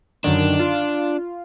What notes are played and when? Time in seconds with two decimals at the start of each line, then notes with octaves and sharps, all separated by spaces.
0.24 F#2 D3 D#3 D4
0.59 F4